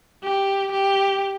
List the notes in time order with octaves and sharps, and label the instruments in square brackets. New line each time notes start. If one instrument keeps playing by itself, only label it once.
[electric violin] G4
G4